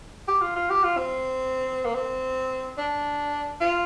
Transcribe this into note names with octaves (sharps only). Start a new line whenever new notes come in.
G4
F4
F4
G4
F4
C4
A#3
C4
D4
F4